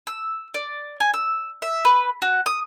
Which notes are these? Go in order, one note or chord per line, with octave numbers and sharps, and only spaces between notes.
E6
D5
G#5
E6
E5
B4
F#4
D#6